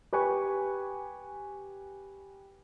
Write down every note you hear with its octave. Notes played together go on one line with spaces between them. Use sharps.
G4 B4 G#5 C#6